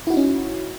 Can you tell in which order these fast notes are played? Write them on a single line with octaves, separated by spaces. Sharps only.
E4 F#4 D#4 C#4